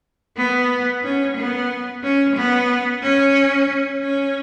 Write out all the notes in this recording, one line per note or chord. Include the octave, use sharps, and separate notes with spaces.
B3
C#4
B3
C#4
B3
C#4
C#4